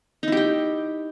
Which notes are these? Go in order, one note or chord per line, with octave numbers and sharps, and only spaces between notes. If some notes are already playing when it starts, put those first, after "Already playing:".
D#4 E4 G4 G5